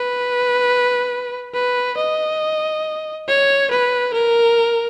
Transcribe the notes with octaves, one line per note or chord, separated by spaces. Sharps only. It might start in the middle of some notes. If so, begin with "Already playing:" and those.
Already playing: B4
B4
D#5
C#5
B4
A#4